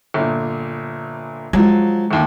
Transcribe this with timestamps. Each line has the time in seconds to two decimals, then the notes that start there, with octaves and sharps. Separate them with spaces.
0.14 G1 A#2
1.53 F3 F#3 G#3
2.11 G1 D#2